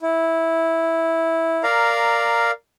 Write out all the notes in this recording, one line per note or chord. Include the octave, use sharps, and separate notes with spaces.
E4
A#4 D5 F5 A#5